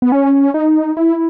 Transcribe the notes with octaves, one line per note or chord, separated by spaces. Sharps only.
B3
C#4
D#4
E4